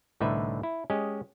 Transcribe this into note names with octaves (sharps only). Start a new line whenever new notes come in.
C2 A2 D3 D#4 B4 E5
E4
G#3 C#4 G4 D#5